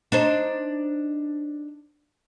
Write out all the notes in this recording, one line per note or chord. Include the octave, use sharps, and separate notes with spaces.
D4 D#4 C5